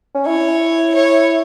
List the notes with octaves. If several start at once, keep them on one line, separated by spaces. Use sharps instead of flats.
C#4
E4 C#5
C#5